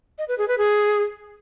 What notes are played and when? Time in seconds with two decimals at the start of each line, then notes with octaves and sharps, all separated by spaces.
0.18 D#5
0.28 B4
0.38 G#4
0.48 B4
0.58 G#4